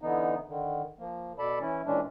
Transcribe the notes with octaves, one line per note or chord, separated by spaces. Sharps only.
D3 E3 B3 D#4
D3 D#3
F3 A#3
B2 A4 D5 A5 B5
E3 C#4 E4
A#2 E3 G#3 C#4 D4